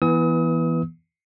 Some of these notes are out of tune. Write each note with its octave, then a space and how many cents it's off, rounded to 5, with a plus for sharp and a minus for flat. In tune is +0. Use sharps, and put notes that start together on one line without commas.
E3 +0 B3 -25 D#6 +40